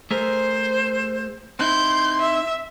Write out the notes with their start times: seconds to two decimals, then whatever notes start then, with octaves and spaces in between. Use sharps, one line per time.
0.11 A3 G#4 A#4 C5
1.59 C4 D#4 E4 C6 G6
2.19 E5